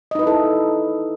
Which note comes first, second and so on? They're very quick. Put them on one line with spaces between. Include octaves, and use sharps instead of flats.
D#5 D#4 B4 E4 A4